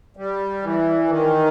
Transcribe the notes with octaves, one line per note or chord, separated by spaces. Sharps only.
G3
E3
D#3